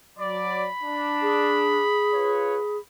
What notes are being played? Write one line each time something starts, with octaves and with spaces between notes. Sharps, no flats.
F#3 D5 B5
D4
G#4
F4 B4 C#5